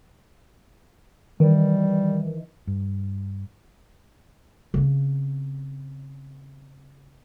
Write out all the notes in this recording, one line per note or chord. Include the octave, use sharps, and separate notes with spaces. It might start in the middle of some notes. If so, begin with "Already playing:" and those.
D#3 E3 G3
G2
C#3 C4